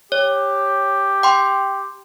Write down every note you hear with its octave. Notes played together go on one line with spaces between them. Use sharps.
G4 C#5
G5 C6